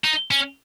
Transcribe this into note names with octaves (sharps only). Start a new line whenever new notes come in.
D#4
C#4